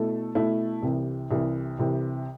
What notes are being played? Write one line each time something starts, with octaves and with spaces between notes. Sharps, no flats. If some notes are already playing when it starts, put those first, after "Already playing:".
Already playing: B2 A3 E4 A4
B2 A3 E4 A4
C2 C3 E3
C2 C3 E3
C2 C3 E3